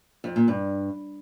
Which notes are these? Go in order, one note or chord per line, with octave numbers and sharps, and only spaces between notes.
F2
A#2
G2